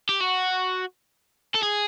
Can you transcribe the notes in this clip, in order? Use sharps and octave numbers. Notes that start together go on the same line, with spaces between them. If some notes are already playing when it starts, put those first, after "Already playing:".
G4
F#4
A4
G#4